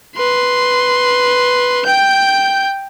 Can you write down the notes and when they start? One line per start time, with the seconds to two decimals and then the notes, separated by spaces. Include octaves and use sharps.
0.16 B4 C6
1.86 G5 G6